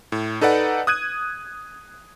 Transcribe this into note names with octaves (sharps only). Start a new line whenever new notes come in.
A2
D#4 A4 B4 D5 F#5
D#6 F#6 G#6 D#7